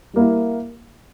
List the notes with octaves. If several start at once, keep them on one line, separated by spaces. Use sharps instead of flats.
G3 A#3 E4